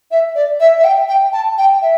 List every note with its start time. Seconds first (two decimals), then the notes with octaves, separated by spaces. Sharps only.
0.11 E5
0.35 D5
0.60 E5
0.78 E5
0.84 G5
1.08 G5
1.33 A5
1.58 G5
1.82 E5